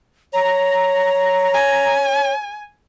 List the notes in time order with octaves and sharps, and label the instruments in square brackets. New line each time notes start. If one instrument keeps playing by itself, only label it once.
[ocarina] C#5 [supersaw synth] A#5
[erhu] G#5